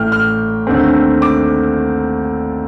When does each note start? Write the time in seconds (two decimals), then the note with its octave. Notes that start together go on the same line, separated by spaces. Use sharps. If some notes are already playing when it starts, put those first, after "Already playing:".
Already playing: A1 A2 A3 G5 F6
0.12 F6
0.67 D#2 D3 A3 C4
1.22 D6